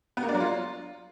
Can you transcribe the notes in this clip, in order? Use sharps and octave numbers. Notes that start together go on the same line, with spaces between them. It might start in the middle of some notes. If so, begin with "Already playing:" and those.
B3
A#3
D4
F#3
F4